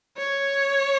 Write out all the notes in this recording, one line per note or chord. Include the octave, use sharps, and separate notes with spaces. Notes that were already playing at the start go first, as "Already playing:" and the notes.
C#5